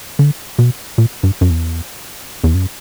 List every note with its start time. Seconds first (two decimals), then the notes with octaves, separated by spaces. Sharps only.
0.19 D3
0.59 B2
0.98 A#2
1.23 G2
1.41 F#2
1.50 E2
2.44 E2
2.55 F#2